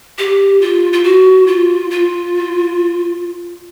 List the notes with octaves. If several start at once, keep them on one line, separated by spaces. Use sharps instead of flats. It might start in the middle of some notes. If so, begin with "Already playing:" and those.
G4
F4
F4
F#4
F4
F4